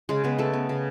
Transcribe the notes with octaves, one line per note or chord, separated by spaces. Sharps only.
C#3 G#3 G#4
C#3 B3 B4
C#3 A3 A4
B3
C#3